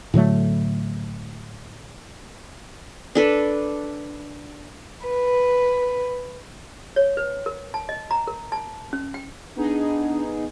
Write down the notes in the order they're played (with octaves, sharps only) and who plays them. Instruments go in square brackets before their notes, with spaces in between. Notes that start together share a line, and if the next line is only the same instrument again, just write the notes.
[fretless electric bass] A2 D3 F#3 A3
[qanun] D4 A4 B4
[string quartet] B4
[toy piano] C#5
B4
A#4
A5
D#5
A#5
A#4
A5
C#4
G5
[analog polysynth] B3 D#4 G#4 [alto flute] D4